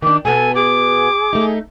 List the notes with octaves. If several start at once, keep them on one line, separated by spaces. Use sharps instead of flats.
D#3 D4 D6
B2 B3 A4 G#5
G#4 D6
A3 D#4